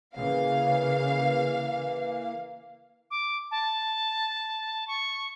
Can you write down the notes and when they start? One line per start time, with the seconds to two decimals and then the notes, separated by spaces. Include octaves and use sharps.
0.16 C#3 E3 A#3 F5
3.10 D6
3.51 A5
4.87 C#6